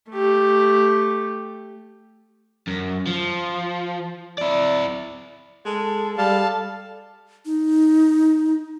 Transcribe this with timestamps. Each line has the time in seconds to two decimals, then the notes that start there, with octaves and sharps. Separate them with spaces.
0.10 A3 G4
2.68 F#2
3.07 F3
4.38 E4 D5
5.65 G#3 A4
6.18 G3 A4 F5 A5
7.46 D#4